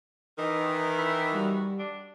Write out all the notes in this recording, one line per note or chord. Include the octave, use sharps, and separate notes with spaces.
D#3 E3 D#5
E4
G3 F#4
D4